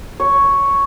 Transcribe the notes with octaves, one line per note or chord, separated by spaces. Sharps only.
C#5